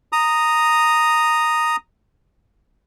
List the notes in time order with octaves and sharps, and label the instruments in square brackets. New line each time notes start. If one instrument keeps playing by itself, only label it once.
[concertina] A#5 D#6